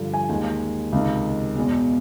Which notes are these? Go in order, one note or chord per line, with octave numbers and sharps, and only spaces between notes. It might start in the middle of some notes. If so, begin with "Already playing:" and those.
Already playing: G2 D3 F3
G#5
D#2 D#3 G#3 G#5
C#2 C3 D#3
E2 B2 G#3